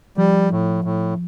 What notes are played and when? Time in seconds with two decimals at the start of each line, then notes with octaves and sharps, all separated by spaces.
0.17 F3 G3
0.51 A2
0.84 A2